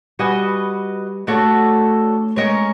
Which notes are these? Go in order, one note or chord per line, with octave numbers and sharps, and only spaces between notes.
G3 F#4 B4 D#5 G#5
A3 D4 F#4 A4 C#5
G#3 C#4 F4 A#4 C#5